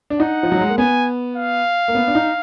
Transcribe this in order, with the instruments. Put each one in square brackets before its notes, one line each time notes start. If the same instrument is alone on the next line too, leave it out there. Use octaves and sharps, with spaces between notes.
[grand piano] D4
[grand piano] D#4 [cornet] F#5
[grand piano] F3
F#3
G#3
A#3
[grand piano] B3 [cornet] G#5
[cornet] F5
[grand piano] A#3
B3
D4
D#4